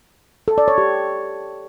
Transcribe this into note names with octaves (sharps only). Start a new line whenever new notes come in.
A4
D5
C#5
G4